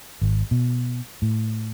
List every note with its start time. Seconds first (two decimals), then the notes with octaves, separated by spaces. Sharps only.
0.22 G#1
0.51 B2
1.22 A2